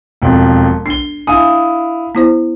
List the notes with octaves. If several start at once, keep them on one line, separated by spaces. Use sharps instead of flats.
E1 F2
D4 C7 G7
D4 E4 F5 G#5 D#6
B3 E4 C5